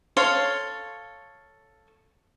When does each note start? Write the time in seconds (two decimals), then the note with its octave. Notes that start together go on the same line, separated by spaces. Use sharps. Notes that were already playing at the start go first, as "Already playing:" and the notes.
0.17 A4 C#5 F5 C6